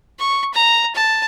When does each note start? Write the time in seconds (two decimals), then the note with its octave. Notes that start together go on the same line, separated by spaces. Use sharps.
0.19 C#6
0.54 A#5
0.95 A5